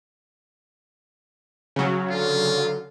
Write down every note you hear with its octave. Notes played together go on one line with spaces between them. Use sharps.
C#3 F#3
D3 F4